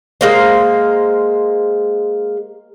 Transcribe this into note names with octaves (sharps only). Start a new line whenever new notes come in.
G#3 A#3 C5